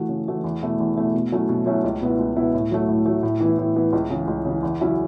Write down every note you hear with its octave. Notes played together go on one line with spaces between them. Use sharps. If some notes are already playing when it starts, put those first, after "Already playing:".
Already playing: E3 A3 F#4
C#3
E3 A3 F#4
E2
B2 A3 E4
E2
B2 A3 E4
B2
F#3 A3 C#4 E4
B2
F#3 A3 C#4 E4
C#2
B2 B3 E4
C#2
B2 B3 E4
A2
F#3 A3
A2
F#3 A3
A2
E3 B3 E4
A2
E3 B3 E4
C#2
C#3 E3
C#2
C#3 E3
E2
C#3 F#3 C#4 E4